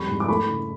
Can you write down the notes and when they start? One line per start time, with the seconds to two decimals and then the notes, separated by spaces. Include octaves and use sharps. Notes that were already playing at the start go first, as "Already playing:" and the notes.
Already playing: F2 G3 B5 C#6
0.09 G#2
0.20 D6
0.28 A3 B5 C#6
0.49 C#3